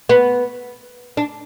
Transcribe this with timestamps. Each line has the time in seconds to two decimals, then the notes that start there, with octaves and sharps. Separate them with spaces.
0.09 B3
1.17 D4